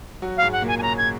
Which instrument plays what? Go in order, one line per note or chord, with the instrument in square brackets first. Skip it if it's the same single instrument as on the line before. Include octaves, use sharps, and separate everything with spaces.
[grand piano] F#3 F#4
[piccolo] F5
[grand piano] G#2 G#3
[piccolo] F#5
[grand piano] A#2 A#3
[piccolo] G#5
G#5
[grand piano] C#3 C#4 [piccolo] A#5
[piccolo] G#6